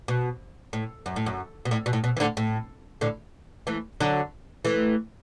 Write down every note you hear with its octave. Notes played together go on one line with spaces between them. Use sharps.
B2
A2
F#2
A2
F#2
B2
A2
B2
A2
B2
E3
A2 D3
A2
A2 D3
E3 A3
D3 F#3
E3 A3